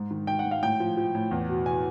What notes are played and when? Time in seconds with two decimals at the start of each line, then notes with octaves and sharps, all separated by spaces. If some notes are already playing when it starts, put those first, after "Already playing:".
Already playing: G#2
0.11 D#3
0.27 D#3 G5
0.39 F#5
0.45 G#2
0.51 F5
0.63 A2 G5
0.80 F3
0.97 F3
1.15 A2
1.31 E2
1.49 B2
1.66 B2 G#5